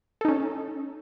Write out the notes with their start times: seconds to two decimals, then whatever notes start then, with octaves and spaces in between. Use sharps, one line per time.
0.21 A4
0.25 D#4
0.28 C#4